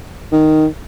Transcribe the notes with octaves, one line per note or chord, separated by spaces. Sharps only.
D#3